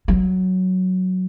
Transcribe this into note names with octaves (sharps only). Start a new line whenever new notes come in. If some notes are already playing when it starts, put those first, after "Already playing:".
F#3